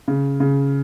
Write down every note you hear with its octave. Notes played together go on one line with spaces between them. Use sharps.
C#3
C#3